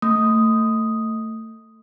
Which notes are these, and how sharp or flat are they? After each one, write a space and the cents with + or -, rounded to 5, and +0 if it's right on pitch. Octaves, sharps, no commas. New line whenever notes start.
A3 +25 D#6 +0